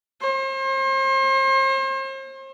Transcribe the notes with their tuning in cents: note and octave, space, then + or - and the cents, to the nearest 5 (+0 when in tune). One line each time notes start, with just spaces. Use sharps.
C5 +40